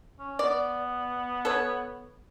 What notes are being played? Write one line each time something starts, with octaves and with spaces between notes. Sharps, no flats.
C#4
B3 D5
A4 B4 C#5